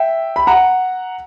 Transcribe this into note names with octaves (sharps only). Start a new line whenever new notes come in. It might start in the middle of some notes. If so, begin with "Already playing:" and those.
Already playing: E5 G5
B5
F#5 A#5